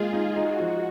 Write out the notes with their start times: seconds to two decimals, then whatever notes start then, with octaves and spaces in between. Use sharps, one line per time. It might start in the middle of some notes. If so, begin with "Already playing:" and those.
Already playing: G#3 A#3 F4 G#4
0.13 D#4
0.36 D#4 F#4
0.60 F3